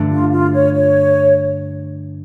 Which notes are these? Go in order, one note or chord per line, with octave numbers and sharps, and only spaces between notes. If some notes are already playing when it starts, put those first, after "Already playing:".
Already playing: G2 D3 A3 D4
F4
F4
C#5
C#5